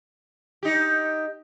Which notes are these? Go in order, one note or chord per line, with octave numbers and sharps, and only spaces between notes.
D#4 G4